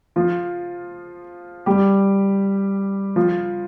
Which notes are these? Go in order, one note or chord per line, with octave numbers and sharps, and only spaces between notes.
F3 F4
G3 G4
F3 F4